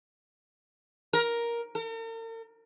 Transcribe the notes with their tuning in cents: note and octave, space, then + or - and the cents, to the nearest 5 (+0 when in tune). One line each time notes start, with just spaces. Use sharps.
A#4 +10
A#4 -45